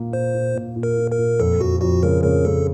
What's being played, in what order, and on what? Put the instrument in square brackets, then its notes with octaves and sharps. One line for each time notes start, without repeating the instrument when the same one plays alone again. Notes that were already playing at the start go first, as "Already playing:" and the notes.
Already playing: [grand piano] A#2 A#3
[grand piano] A#2 [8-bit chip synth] C5
[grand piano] A#2
A#2
A#2
[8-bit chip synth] A#4
[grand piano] A#2
[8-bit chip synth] A#4
[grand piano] A#2
[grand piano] F2 [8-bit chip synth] A4
[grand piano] F2 [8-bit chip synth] F#4
[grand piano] F2 [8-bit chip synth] F#4
[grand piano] C#3 [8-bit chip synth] A#4
[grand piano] C#3 [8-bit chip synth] A#4
[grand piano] C#3 [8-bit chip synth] A4